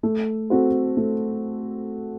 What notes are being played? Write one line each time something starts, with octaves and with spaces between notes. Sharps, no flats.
A3
C4 F#4 A4 C5
A3